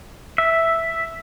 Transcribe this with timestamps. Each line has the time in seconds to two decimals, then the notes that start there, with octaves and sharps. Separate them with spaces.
0.38 E5